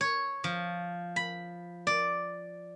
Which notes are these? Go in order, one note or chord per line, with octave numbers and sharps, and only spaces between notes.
C#5
F3
B5
D5